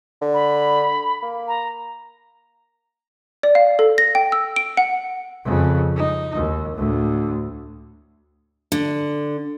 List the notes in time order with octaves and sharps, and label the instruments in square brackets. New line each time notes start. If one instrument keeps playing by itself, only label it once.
[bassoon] D3
[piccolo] B5
[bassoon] A#3
[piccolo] A#5
[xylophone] D5
F5
A4
A#6
G5
E6
D7
F#5
[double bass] F2 C#3
D#4
D#2
D2 A2
[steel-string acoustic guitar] D3